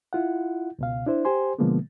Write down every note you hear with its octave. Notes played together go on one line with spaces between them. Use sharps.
E4 F4 F#5
C#2 B2 F5
D4 E4 C5
G4 C5 G#5 C6
B2 D3 F3 G#3 A#3 B3